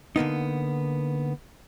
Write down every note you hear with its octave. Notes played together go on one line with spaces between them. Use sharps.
D3 A#3 B3 D#4